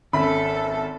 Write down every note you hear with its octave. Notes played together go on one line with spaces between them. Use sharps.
G#1 C#4 A4 E5 B5 B6